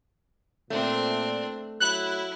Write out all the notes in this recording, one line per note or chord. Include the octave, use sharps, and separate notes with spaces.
A#2 A3 C4 D4
F#3 E4 F#6